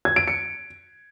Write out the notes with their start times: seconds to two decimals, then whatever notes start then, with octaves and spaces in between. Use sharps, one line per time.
0.05 G#6
0.16 D7
0.28 C#7